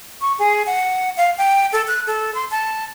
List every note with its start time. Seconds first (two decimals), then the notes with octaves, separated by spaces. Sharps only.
0.21 C#6
0.39 G#4
0.66 F#5
1.17 F5
1.38 G5
1.72 A4
1.88 F#6
2.07 A4
2.35 C6
2.51 A5